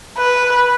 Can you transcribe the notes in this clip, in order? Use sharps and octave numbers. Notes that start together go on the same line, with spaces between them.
B4